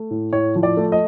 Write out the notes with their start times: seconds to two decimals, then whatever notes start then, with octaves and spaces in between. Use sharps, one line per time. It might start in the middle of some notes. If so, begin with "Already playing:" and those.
Already playing: A3
0.11 A2
0.33 A2 C#5
0.56 F3
0.63 D5
0.77 A3
0.92 D#5